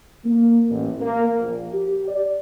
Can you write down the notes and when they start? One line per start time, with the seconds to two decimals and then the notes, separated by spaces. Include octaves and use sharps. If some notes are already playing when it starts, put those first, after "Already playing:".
0.24 A#3
0.70 A1
1.00 A#3
1.38 A#1
1.73 G4
2.08 D5